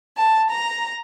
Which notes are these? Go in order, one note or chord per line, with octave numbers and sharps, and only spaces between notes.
A5
A#5